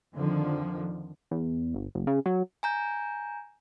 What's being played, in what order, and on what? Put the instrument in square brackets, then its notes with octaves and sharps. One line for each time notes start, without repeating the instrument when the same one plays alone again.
[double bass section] F2 D3 D#3 F3
[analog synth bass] E2
G1
F#1
C#3
F#3
[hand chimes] G#5 A#5 G6